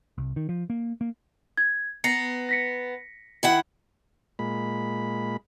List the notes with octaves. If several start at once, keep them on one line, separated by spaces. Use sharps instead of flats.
C2
D#3
F3
A#3
A#3
G#6
B3 A#5 A#6 C7 C#7
A#6 B6 C#7
D#3 E4 F#5
A#2 G#3 B5